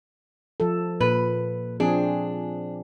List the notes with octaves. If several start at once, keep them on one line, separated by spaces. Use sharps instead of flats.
F3 A4
A#2 B4
F3 C4 D4 G#4